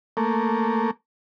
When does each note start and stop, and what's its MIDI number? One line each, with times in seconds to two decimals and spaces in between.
0.17 0.91 57
0.17 0.91 58